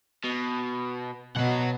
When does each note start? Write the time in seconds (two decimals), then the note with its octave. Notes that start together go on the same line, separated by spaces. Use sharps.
0.24 B2
1.37 B2 C#5 F#5